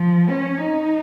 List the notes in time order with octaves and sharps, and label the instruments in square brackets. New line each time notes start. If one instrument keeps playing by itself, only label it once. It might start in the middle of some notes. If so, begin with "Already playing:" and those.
Already playing: [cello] F3
C#4
D#4